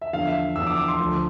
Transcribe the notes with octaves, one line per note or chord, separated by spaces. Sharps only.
E5
E2 D3 F3 F5
E5
E2 D3 F3 E6
D6
D6
C6
D2 D3 F3